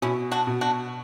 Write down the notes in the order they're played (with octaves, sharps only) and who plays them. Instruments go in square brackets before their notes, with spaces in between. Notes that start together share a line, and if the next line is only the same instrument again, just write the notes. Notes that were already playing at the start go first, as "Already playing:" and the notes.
[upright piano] B2 [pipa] C#4 E4
[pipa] D4 F#4
[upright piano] B2
[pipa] D4 F#4